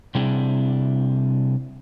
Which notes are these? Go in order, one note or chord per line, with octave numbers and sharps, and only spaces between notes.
C3 G3 C4 D4 E4 G#4